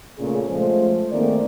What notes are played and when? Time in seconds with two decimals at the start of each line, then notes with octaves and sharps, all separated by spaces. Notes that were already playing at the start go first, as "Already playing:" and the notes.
0.18 A#2 C#3 A3 C#4 G#4
0.48 F3 G#3 A3 C5
1.12 D#3 A3 A#3 C4 G#4 D5